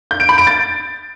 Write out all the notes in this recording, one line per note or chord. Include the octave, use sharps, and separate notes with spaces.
G6
D7
B5
D7
A6